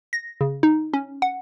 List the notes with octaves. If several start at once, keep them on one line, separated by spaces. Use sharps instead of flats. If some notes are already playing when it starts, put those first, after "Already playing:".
A#6
C#3
D#4
C#4
F#5